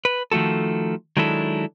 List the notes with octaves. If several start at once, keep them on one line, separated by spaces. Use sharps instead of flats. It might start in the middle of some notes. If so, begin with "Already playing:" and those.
B4
D#3 F3 A3 F#4 A4
D#3 F#3 G#3 D4 E4 A4